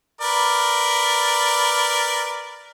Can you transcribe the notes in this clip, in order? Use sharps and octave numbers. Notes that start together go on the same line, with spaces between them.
A#4 B4 D5